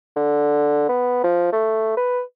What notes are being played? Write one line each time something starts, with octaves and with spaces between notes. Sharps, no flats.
D3
B3
F3
A3
B4